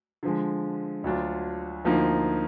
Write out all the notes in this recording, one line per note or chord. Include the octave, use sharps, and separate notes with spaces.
D3 F3 G#3
D2 D3 F#3 D4 F4
D2 D3 F3 A#3 D#4